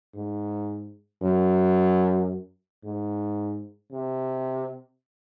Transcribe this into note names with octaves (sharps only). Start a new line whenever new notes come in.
G#2
F#2
G#2
C3